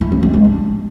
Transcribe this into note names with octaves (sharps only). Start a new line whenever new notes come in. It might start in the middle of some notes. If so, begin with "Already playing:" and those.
E4
A#3
G#3
G#3
D4